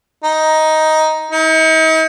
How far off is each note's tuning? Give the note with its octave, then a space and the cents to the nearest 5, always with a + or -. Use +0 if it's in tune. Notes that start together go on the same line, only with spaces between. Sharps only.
D#4 +10
D#4 +45